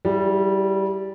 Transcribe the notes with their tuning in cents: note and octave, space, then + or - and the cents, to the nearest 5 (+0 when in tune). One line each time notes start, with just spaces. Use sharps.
G3 -15 E4 +5 G#4 -45